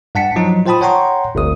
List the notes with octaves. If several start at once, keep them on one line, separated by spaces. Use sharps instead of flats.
G2 F#5 A5 B6 C#7
F3 F#3 D#4
F4 C5 G5 A5 B5 D#6
C#5 F#5 G5 A#5 C6 C#6
G1 D2 D#6